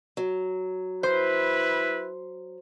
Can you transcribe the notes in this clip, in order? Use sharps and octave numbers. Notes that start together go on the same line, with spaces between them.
F#3
E4 B4 C5